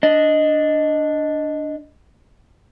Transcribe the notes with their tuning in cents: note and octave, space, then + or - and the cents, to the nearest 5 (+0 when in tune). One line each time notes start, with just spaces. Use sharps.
D4 +0 D#5 +0